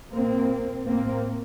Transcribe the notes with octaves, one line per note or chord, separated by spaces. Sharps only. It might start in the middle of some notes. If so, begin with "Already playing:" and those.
A#2 A#3 C4
A2 A#3 C4